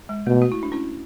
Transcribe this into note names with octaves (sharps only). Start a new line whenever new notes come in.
G#3
B2 A3
F#4
E4
D4
C#4 E4